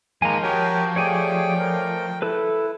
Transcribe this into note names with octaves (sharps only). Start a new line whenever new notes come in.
D#3 F3 G#3 A#3 G#5 A#5
F#4 G4 A#4 C#5 G5
A3 G4 G#4 C#5 D5 G5 G#5
A3 A#4
E4 A4 B4